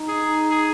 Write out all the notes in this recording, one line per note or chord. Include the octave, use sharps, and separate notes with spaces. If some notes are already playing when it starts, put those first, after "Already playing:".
Already playing: D#4
G#4
G#4